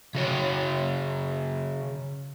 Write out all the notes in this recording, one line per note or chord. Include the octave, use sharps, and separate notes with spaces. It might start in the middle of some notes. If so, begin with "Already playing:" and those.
C#3 F#4 C#5 G5